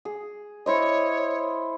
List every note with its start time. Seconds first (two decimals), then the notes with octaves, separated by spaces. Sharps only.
0.05 G#4
0.66 E4 C5 C#5 D#5